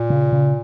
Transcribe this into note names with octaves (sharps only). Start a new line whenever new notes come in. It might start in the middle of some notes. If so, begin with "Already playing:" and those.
Already playing: A#2
C#3
C#3